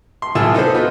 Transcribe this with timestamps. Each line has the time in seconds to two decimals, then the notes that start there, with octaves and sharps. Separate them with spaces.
0.22 C6
0.35 C2 E4 F4 G#4 A5 E6
0.54 D#4 A4 B4 C5
0.74 B3 F4 F#4